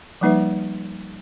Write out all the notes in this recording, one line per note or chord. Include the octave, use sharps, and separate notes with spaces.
F3 G3 A#3 D#4 B4 E5